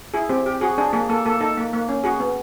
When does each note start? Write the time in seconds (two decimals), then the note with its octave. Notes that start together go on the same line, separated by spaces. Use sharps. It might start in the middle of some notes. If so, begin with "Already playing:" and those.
0.14 E4 G#4
0.29 C4 G4
0.46 G4
0.61 F#4 G#4
0.78 D4 G#4
0.93 A#3 G#4
1.09 A#3 A4
1.25 A#3 A4
1.41 D#4 A4
1.57 A#3
1.73 A#3
1.89 C#4
2.04 F#4 G#4
2.20 B3